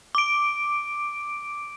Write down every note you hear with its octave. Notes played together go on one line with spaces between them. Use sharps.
D6 D7